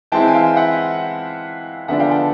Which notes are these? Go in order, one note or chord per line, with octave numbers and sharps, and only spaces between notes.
E3 G#3 C4 E4 G5 A5
G#5
F5 G5
E5 F#5
D3 F3 G#3 B3 D4 E5 F#5
F5 G5
G5 A5